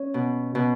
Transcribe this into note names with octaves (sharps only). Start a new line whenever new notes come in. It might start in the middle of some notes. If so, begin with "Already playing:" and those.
Already playing: C#4
B2
B2